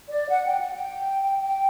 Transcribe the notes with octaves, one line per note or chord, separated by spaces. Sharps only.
D5
F#5
G5
F#5
G5
G5